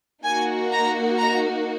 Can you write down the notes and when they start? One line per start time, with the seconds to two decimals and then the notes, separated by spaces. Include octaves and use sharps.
0.24 A#3 D#4 F#4 G#5
0.72 A#5
1.19 A#5